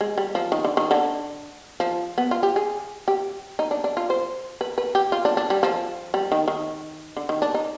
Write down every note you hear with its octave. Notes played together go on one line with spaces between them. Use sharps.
G#3
G3
F3
D#3
D3
D#3
D3
F3
B3
F4
G4
G#4
G4
D#4
D4
D4
F4
C5
B4
B4
G4
F4
D4
D4
G3
F3
G3
D#3
D#3
D3
D#3
D4
D#4